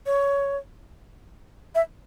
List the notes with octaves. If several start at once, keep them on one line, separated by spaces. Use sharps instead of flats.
C#5
E5